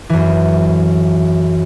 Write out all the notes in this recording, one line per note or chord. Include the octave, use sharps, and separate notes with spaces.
F#2 E3